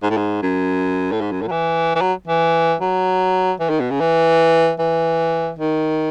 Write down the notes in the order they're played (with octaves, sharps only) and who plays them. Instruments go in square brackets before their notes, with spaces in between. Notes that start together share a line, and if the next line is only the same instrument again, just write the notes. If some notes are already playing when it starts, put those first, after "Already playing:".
[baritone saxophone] G#2
A2
G#2
F#2
A2
G#2
F#2
A2
F#3
E3
E3
F#3
E3
F#3
E3
D#3
B2
C#3
E3
E3
D#3